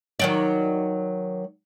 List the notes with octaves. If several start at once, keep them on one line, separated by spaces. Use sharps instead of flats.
D#3 F#3 D5